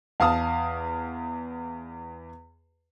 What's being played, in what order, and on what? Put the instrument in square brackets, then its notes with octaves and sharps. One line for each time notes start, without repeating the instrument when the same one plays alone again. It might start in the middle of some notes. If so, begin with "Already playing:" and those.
[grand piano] E2 F5 A5 D#6